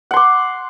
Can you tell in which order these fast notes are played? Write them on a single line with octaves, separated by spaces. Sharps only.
F#5 C6 D6